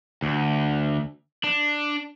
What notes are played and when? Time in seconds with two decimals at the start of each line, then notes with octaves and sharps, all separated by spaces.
0.22 D2
1.44 D4